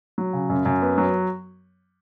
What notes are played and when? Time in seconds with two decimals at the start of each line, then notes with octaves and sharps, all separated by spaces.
0.18 F#3
0.33 C#3
0.49 F#2
0.65 F#2
0.82 B3
0.98 F#3